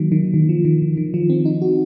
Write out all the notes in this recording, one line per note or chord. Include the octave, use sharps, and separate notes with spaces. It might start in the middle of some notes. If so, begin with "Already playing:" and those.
Already playing: D#3 F#3 A#3
D#3
D#3
F3
D#3
D#3
D#3
F3
C4
D#4
F#4